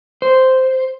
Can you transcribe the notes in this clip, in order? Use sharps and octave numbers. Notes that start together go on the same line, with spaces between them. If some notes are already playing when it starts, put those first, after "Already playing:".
C5